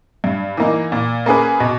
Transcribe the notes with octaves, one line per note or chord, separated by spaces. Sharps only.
G2
E3 A#3 D#4
A#2
A#3 C#4 G#4 B4
B2